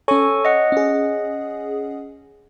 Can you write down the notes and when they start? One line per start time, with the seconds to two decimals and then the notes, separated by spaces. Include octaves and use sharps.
0.08 C#4 A4 C#5 G#5 C#6
0.45 D#5 F#5
0.72 C#4 G#4